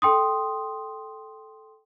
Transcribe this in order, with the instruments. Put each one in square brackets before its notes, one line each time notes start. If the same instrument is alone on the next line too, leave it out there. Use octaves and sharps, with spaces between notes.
[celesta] A4 G5 C6 D#6